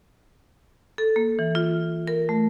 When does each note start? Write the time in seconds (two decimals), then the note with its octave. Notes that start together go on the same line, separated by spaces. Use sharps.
0.98 A4
1.16 A#3
1.39 E3
1.55 F4
2.08 A#4
2.29 A3